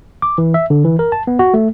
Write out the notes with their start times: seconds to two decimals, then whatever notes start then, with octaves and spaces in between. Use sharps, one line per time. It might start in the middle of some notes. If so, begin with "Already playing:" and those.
0.22 D6
0.38 E3
0.54 E5
0.70 D3
0.84 E3
0.99 A#4
1.12 A5
1.27 B3
1.39 F#4
1.54 A3